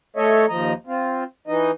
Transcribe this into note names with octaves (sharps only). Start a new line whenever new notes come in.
A3 A4 C#5 D#5 E5
D#2 F3 D#5 A#5
C4 F4
E3 D#4 D#5